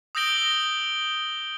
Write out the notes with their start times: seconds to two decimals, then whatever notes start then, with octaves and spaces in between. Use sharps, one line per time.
0.15 D#6 E6 G6 A#6 D7 G7